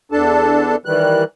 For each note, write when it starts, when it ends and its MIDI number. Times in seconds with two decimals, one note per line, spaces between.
0.12 0.76 40
0.12 0.76 62
0.12 0.76 69
0.12 0.76 81
0.85 1.24 51
0.85 1.24 52
0.85 1.24 55
0.85 1.24 90